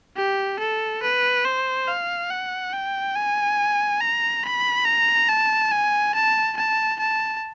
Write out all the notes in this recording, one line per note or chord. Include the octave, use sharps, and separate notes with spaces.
G4
A4
B4
C5
F5
F#5
G5
G#5
A#5
B5
A#5
A5
G#5
A5
A5
A5